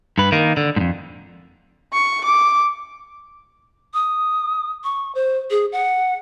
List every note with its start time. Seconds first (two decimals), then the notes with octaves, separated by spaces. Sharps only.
0.18 G2 B4
0.32 D#3 A#3
0.57 D3
0.76 F2 G#2
1.93 C#6
2.25 D6
3.94 D#6
4.84 C#6
5.15 C5
5.51 G#4
5.72 F#5